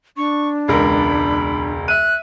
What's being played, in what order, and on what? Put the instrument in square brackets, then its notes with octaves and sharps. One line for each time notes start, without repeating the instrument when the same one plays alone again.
[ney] D4 [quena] C#6
[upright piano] E1 C#2 A#4 [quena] B5
[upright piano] E5 D#7 [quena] F#6